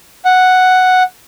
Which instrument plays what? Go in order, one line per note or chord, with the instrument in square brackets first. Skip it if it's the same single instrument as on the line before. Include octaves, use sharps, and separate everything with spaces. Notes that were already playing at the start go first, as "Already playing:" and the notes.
[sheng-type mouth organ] F#5